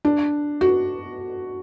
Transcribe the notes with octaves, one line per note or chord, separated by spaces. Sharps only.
D4
F#4